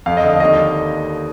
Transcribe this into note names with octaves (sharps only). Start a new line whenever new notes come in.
F2 F5
D#5
D3
F5
D#2 D#5